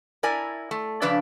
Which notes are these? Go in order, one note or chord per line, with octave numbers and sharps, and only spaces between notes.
E4 A#4 D5 G#5
A3
C#3 F3 D4 B4 D5 E5